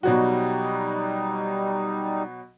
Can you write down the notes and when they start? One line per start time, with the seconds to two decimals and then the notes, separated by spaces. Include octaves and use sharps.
0.03 B2 F#3 G3 D#4 F#4